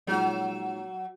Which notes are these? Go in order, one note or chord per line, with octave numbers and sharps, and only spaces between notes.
A#2 F3 F#3 G#3 D#4